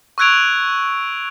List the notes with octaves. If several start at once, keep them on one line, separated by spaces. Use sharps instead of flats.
C#6 E6 F#6 G#6 D7 F7